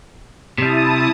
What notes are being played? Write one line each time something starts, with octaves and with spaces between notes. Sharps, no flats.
C3 G3 E4 A5 D#6